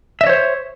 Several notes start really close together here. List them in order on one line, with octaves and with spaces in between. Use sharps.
E5 D#5 C#5 C5